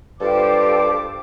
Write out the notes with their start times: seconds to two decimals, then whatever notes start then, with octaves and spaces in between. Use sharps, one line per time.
0.21 G2 F4 G4 A4 C5 D6